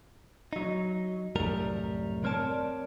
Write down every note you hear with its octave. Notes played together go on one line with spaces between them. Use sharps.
F#3 D#4
C2 F#2 A2 G3 A#4 A#5
G3 C4 A#4 C#5 D5 A5